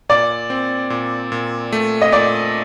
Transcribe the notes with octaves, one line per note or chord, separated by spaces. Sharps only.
A#2 D5
C4
A#2
A#2
A3
D#5
A#2 D5